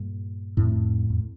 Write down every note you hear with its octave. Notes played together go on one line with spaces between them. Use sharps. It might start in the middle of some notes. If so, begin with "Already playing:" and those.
Already playing: G2 A#2
F2 A2
F2